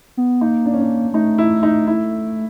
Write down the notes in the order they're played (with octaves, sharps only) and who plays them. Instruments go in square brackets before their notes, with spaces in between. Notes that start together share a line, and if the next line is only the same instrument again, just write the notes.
[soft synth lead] B3
[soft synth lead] A#3 [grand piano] D#4
[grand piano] D4
C#4
D4
[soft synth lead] A3 [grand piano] D#4
[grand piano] E4
D#4
E4